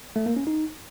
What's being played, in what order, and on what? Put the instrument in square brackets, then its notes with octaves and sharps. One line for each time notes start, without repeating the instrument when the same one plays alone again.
[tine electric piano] A3
A#3
C#4
D#4